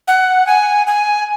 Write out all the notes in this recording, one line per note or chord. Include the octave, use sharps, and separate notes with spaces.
F#5
G#5
G#5